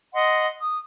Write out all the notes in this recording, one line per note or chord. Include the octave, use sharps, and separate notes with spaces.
D#5 F#5 C6
D#6